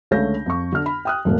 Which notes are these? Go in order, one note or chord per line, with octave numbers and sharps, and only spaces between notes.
C#2 D3 A3 C#5 G6 A#6
F2 C#6
D3 F6
B5
G5 D#6 F#6
E1 A2 A#3